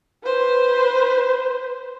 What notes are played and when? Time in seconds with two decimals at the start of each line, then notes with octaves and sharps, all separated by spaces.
0.23 B4 C5